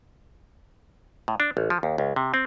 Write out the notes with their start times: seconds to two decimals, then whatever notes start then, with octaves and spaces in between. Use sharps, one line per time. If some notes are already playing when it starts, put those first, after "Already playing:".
1.28 A2
1.40 D4
1.57 A1
1.70 F3
1.83 D#2
1.98 C#2
2.16 C3
2.34 C4